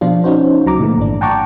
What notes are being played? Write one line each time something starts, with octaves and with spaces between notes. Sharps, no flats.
B2 F3 D4 F4
C#4 D#4 F#4 C5
C#2 F#3 A#5 D6
A#2 D3 E3 A3
G#1 D4
F#5 G5 A5 A#5 C#6 D6